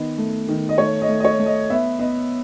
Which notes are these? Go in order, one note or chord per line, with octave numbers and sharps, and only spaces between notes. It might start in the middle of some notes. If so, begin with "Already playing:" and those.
Already playing: D#3 B3 D#5
A3
D#3
D#5
A3 C#5
D#5
A3
D#5
C#5
A3
D#5
B3 E5
B3 D#5